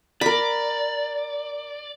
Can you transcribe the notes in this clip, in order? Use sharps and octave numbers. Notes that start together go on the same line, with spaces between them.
A#4 D5 B5